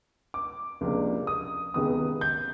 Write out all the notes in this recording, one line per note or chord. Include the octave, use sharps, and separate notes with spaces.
D6
C#2 C3 F3 A#3 D4
D#6
C#2 C3 D#3 G#3 B3 D#6
G6